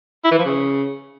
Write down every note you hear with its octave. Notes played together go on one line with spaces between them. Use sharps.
E4
E3
F3
C#3